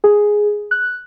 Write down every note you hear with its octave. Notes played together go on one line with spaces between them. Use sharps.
G#4
F#6